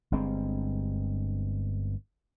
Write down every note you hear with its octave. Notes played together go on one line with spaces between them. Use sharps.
G1 G2 G#3 C4